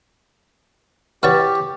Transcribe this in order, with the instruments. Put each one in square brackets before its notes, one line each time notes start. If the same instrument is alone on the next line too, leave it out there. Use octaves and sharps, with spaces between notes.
[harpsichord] E4 F#4 C#5 [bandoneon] G4 [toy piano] B4 [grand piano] C#6 A6